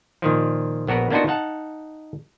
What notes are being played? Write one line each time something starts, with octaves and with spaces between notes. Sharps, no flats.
A#2 D#3 F3
A#1 B3 F#4 A#4 B4
A#3 B3 D4 D#4 F4 F#4
D#4 F5 F#5 A5